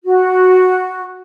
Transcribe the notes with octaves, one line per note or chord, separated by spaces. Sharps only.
F#4